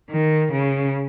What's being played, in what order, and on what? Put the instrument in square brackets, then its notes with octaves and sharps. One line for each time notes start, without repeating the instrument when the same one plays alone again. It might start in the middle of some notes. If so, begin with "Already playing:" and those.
[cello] D#3
C#3